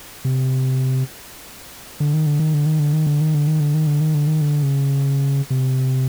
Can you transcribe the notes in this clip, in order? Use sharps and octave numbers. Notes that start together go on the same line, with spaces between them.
C3
D3
D#3
D3
D#3
D3
D#3
D3
D#3
D3
D#3
D3
D#3
D3
D#3
D3
D#3
D3
D#3
D3
C#3
C3